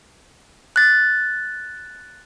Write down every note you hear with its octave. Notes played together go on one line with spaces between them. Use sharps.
F#6 A6